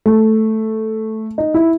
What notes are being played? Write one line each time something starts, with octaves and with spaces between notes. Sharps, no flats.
A3
D#4
E4